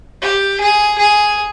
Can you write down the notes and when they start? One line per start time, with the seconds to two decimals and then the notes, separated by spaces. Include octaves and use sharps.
0.22 G4
0.60 G#4
0.98 G#4